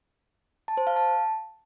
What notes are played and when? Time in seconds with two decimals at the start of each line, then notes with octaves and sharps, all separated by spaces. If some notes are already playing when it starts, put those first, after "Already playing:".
0.68 A5
0.77 C5
0.87 F5
0.96 A5